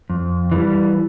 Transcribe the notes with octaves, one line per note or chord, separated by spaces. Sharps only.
F2
E3 G3